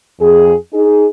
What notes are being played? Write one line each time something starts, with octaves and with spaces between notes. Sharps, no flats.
F2 G#4
D#4 G#4